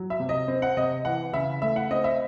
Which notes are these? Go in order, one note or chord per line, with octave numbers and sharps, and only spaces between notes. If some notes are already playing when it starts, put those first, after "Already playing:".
Already playing: F#3
E5
C3
D#5
C4
F#5
C3 D#5
E3 F#5
C#3 E5
A3 E5
F#5
C4 D#5
E5